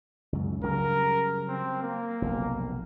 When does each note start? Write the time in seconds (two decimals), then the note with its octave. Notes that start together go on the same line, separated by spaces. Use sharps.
0.33 C#2 F#2
0.63 C#3 F#3 G3 A#4
1.48 C4
1.82 A#3
2.22 F1 B1